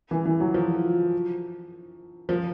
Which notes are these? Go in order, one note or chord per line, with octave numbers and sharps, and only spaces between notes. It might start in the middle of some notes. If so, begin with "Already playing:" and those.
E3
E3
F#3
F3
F3